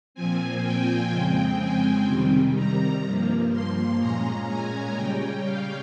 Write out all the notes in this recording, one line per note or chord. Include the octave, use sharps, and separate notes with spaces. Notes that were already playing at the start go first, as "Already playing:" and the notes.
A#2 F3 C4 G#5
G5
F2 C#3 G#3 C4 G5
G#5
C3 D#3 G3
A#5
G2 F3 A#3
C6
A#2 G#3 C#4 A#5
G#5
C#3 G3 C#4 G5
F5